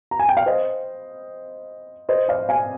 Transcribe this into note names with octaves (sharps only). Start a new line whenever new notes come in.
A#5
G#5
G5
F5
C5 D#5
C5 D#5
D5 F5
F5 G#5